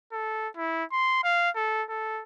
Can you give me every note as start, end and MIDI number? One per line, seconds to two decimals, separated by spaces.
0.12 0.48 69
0.57 0.84 64
0.92 1.21 84
1.24 1.50 77
1.55 1.83 69
1.89 2.23 69